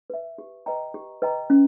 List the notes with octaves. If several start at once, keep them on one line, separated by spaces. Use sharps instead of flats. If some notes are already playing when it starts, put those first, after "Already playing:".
B4 E5
G4
B4 D#5 G5 A#5
G4
B4 D#5 G5 A#5
C#4